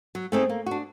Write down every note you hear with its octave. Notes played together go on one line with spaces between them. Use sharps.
F#3
A3 C4 D#4 G#4
A#3
D4 F#4